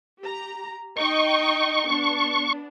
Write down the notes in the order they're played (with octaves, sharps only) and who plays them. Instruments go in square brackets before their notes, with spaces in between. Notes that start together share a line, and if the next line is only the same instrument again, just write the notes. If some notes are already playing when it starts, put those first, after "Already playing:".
[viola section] G4 A#5
[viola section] D#4 D#5 G5 [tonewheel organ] C#6
[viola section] B3 D4